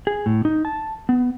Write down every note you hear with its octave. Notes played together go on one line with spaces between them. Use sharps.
G#4
A2
D#4
A5
B3